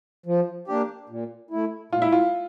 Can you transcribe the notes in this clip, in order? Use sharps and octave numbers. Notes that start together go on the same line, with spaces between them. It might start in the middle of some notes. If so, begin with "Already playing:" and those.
F3
A#3 D4 G4
A#2
A3 E4
A#2 F4
E4
F4